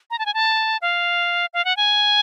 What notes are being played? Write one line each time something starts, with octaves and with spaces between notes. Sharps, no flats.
A#5
A5
G#5
A5
F5
F5
F#5
G#5